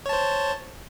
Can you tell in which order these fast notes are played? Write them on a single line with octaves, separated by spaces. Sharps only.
C#5 A5 C5